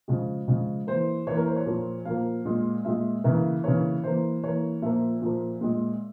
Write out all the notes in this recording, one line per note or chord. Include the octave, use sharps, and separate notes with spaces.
C#3 F3 G#3
C#3 F3 G#3
E3 A#3 C5
E3 A#3 C#5
A#4
C5
C#5
A#2 F3 A#3
A#2 F3 A#3 F5
A#2 G#3
A#2 G#3 E5
C#3 E3 A#3 E5
C#3 E3 A#3 C#5
E3 A#3 C5
E3 A#3 C#5
A#2 F3 A#3 E5
A#2 F3 A#3
A#2 G#3